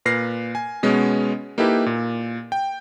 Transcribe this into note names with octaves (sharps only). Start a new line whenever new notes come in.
A#2 B4 F6 A#6 C7
G#5
B2 G#3 B3 C#4
A#3 D#4 E4 G4 A4 B4
A#2
G5